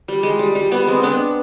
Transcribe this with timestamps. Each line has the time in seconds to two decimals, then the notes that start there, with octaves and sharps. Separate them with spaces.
0.08 G3
0.23 G#3
0.39 G3
0.55 G3
0.71 G3 B3
0.87 G#3 C4
1.03 B3 D4